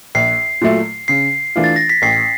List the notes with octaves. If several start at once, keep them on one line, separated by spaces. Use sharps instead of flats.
A#1 C7
A#2 F#3 A3
C#3 C7
E3 A3 D4 F4
A6
A#6
B6
A1 C7